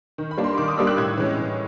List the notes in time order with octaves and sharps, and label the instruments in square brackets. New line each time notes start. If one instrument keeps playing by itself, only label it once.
[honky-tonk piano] D#3
B5
G3 A#3 D4
C6
D#3 D6
D#6
G3 A#3 D4 E6
F#6
A2 G#6
E3 G#3 C#4
A2